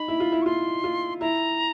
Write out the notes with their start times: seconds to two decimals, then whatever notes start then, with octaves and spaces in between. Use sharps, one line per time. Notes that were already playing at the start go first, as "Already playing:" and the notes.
Already playing: D#4 B5
0.08 E4
0.20 F4
0.32 E4
0.42 C#6
0.46 F4 C6
0.84 F4
1.21 E4 A#5